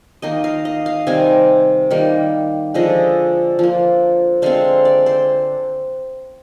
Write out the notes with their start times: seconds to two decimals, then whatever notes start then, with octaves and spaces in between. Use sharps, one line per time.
0.22 D#3 A#3 D#5
0.44 F5
0.65 D#5
0.86 F5
1.07 C3 D#3 G3 C4 G#5
1.90 D#3 G3 A#3
2.74 D3 F3 G#3 D#5
3.59 F3 A#3
4.42 D3 G#3 C4 F5
4.85 D5
5.06 C5